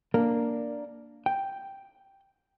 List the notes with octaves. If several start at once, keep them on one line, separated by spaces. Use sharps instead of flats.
A#3 D4 A#4
G5